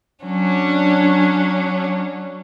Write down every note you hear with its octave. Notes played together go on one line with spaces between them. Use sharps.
F#3 C#4 D4